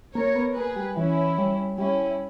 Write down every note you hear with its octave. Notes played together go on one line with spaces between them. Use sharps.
A#3 A#4 C#5
B3
A#3 G#4 B4
G3
E3 C#4 E4
G3
G3 C#4 E4